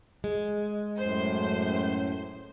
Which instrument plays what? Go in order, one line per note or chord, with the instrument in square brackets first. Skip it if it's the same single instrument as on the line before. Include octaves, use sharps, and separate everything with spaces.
[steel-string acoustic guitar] G#3
[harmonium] F#2 A2 [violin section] C5